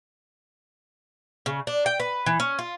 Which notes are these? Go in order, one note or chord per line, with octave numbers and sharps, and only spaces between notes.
C#3
D4
G5
B4
E3
C#4
F4